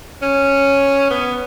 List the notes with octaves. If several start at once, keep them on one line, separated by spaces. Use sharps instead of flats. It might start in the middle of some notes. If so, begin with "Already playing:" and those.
C#4
B3